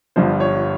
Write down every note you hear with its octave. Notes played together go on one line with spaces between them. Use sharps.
G1 G2 F3 C5
C#5